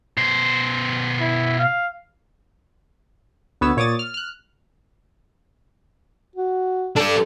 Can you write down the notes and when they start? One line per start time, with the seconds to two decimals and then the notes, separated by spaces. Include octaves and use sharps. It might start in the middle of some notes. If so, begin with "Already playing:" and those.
0.17 B2 C5
1.20 E4
1.59 F5
3.61 D2 B3 C#5 E6
3.77 A#2 C#5 D6 D#6 A6
3.99 F6
4.14 F6 F#6
6.36 F#4
6.96 D4 G4 A4